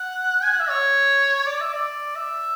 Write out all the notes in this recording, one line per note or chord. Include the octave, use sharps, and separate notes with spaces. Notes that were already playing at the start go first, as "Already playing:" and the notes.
Already playing: F#5
G#5
F#5
E5
C#5
D5
E5
D5
E5